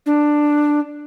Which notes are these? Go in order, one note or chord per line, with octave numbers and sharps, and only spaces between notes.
D4